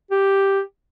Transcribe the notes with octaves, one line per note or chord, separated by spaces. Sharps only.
G4